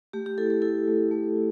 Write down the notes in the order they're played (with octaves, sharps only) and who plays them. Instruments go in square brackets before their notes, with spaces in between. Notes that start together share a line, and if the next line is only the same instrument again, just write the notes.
[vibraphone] A3 G4
G4
E4 A4
A4
E4 A4
A3
A3
E4